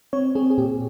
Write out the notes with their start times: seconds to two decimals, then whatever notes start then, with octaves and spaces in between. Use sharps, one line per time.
0.13 C4 C#5
0.35 C4 G#4
0.50 G#4
0.58 A#2 G4